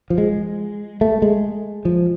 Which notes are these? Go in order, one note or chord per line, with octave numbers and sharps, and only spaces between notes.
F3
G#3
A3
G#3
F3